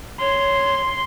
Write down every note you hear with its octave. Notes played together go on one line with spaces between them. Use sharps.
C#5 C6